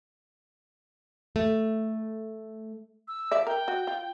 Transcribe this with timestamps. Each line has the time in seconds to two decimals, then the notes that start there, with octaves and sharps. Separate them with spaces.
1.36 A3
3.08 E6
3.31 F3 D5 E5
3.47 A#4 G5
3.68 F#4
3.87 F4